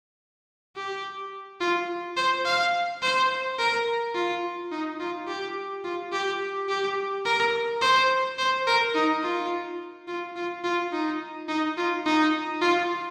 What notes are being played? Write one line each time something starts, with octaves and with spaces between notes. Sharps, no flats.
G4
F4
C5
F5
C5
A#4
F4
D#4
F4
G4
F4
G4
G4
A#4
C5
C5
A#4
D#4
F4
F4
F4
F4
D#4
D#4
F4
D#4
F4